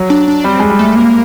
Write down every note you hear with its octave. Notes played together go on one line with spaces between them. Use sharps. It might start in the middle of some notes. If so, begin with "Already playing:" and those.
Already playing: F#3
D4
D4
G3 C4
G#3
G3
A3
A#3